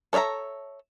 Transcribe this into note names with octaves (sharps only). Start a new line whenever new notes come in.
A4 C#5 D5 E5 A#5